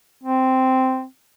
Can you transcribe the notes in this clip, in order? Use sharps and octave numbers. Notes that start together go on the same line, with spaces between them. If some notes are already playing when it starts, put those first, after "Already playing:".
C4